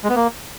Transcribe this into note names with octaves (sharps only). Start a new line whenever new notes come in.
G#3
B3
A#3